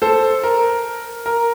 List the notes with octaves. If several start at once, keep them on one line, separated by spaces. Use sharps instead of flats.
A4 C5
A#4
A#4